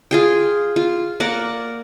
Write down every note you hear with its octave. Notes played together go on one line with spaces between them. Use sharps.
F4 G#4 G5
F4
A#3 A#4 D5 F#5